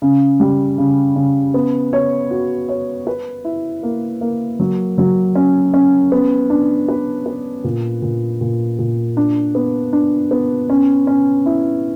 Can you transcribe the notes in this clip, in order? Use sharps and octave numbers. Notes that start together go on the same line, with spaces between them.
C#3
G3
C#3
C#3
B3
C#5
F#4
C#5
B4
E4
A#3
A#3
F#3
F#3
C#4
C#4
B3
D4
B4
B4
A#2
A#2
A#2
A#2
D4
B3
D4
B3
C#4
C#4
E4